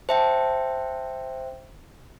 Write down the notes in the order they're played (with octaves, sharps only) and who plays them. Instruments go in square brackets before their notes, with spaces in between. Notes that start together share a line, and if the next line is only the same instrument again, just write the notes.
[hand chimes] C5 E5 G5 [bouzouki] A5